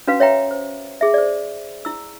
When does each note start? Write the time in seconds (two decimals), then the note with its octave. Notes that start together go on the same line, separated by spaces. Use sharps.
0.07 C#4 F#4 B4 F5
0.20 C#5 E5 G5 A#5
0.51 C5
1.01 G#4 E5
1.14 C5 D5
1.85 E4 E6